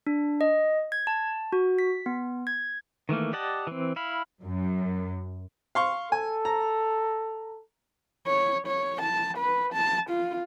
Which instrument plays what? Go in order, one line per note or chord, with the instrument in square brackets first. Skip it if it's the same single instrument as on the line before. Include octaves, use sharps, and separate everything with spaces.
[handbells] D4
D#5
G#6
A5
F#4
B6
B3
G#6
[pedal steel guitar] D#3 E3 A3 A#3
G4 D5 D#5 F#5 A5
E3 C4
E4 F5 B5
[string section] F#2
[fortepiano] F5 C6 C#6
[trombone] A4 [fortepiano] G#5
[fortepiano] A#5
[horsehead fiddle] C#5
C#5
A5
B4
A5
F4